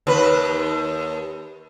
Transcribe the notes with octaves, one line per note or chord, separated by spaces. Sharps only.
D#2 B4